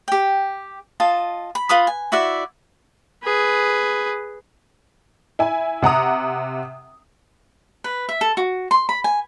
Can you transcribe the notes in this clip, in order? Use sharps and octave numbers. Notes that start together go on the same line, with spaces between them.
G4 G5
F4 D#5 A5
B5
F4 B4 B5 D#6
G#5
E4 F#4 D5 E5
G#4 B4
E4 G#5
C3 F#5 A#5 D#6
B4
E5
A4
F#4
C6
B5
G#5